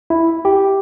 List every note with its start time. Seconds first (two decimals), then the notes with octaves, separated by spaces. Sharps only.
0.10 E4
0.45 G4